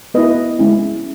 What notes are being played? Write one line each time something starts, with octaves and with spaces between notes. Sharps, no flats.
B3 E4 B4 D#5
G#3 C#4 E4